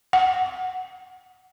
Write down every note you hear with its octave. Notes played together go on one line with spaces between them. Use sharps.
F#5